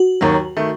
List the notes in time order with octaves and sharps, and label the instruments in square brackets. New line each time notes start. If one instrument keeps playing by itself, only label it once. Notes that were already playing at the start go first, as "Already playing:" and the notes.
Already playing: [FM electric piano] F#4
[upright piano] D#2 D#3 F#3
D#3 A3